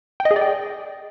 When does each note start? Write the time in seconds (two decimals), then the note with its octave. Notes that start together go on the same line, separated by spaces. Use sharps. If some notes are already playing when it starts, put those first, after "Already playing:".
0.20 G5
0.25 D#5
0.31 G#4
0.36 D5
0.41 G5